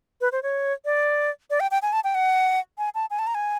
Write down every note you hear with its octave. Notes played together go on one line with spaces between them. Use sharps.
B4
C5
C#5
D5
D5
G5
G5
G#5
A5
G5
F#5
G#5
A5
G#5
A5
A#5
G#5